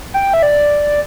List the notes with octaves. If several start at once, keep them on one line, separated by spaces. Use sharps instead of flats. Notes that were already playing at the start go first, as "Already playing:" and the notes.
G5
E5
D5